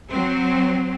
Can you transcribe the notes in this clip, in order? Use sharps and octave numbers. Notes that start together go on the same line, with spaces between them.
F#3 C4